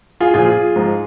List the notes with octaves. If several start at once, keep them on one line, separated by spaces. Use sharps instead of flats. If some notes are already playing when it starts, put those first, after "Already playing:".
F4 G#4
A#2 F3 F4 G#4
G#2 F3